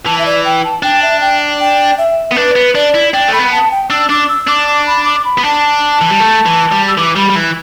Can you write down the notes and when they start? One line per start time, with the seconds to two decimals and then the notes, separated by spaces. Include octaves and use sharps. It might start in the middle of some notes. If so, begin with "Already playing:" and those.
0.06 E3 A5
0.18 E5
0.26 D5
0.45 G5
0.64 A5
0.83 D4 G5
1.02 E5
1.21 G5
1.60 G5
1.98 E5
2.31 B3
2.36 D4 B4
2.56 B3
2.75 D4 D5
2.95 E4
3.13 D4 G5
3.28 A3 B5
3.39 B3
3.52 A5
3.71 G5
3.90 D4 E6
4.09 D4 D6
4.29 E6
4.48 D4 D6
4.67 D6
4.86 B5
5.05 D6
5.25 B5
5.38 B3
5.44 D4 A5
6.01 E3
6.11 G3
6.20 A3
6.46 E3
6.72 G3
6.88 E6
6.98 E3 D6
7.16 G3 B5
7.30 G3
7.36 E3